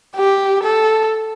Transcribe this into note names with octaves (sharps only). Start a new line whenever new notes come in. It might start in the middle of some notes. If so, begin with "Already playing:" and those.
G4
A4